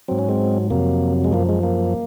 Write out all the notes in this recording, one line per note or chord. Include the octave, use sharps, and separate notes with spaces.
G#2 F#3 C4
C#4
G#3 C4
F2 C3 F#3 A#3
G#3
F#2 F3 A#3
G#3
A#3